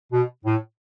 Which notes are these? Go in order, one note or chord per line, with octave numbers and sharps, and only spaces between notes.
B2
A2